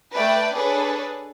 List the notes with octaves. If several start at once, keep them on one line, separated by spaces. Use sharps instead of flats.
A3 B4 D5 G5
D4 G#4 A4 B4 C#5